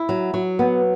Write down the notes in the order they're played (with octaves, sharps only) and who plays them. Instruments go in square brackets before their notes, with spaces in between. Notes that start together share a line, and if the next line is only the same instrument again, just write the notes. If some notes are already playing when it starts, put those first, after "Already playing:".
Already playing: [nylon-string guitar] E4
F#3
F#3
B3